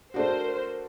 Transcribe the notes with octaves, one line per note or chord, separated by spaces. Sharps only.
A3 D4 F#4 A#4 C5